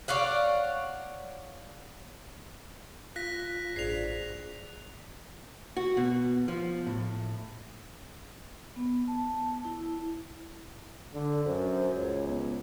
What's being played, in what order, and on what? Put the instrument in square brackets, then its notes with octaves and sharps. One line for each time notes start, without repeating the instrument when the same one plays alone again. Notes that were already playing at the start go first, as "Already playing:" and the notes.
[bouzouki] C#5 D5 F5 F#5
[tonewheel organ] F4 [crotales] F#6 A#6 B6
[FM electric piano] A1 G2 D4 [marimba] G#4 C5 D5 [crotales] C7 F7
[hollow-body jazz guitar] F#4
B2
F3
A2
[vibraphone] B3
A5
E4
[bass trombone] D3 [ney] A4
[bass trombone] F#2 [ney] C5
[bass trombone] C#2 [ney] C#5
[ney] B3